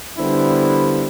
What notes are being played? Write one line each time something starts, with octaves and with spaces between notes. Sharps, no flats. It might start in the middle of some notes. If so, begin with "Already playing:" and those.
D3 G3 B3 D4 E4 C5